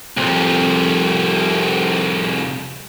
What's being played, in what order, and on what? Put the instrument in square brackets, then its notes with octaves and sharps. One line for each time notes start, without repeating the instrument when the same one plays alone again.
[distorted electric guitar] C2 F2